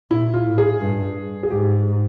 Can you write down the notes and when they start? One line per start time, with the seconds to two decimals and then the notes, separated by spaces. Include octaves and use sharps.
0.11 A#2 E4
0.34 F4
0.46 A2
0.58 G#4
0.81 G2
1.43 G#4
1.50 G#2 G4